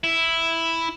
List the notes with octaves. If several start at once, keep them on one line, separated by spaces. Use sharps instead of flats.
E4